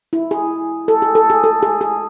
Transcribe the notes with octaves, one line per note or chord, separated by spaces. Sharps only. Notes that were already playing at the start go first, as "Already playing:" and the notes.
E4
G#4
A4
G#4
A4
G#4
A4
G#4
G#4